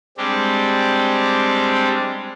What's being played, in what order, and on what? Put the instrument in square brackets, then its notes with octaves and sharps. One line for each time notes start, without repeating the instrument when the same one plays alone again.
[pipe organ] G3 G#3 C4 D4 G4